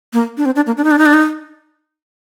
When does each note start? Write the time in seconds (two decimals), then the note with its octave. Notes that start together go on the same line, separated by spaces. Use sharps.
0.13 A#3
0.37 D4
0.45 C4
0.56 D4
0.67 A#3
0.77 D4
0.84 D#4
0.91 D4
0.99 D#4
1.06 D4
1.14 D#4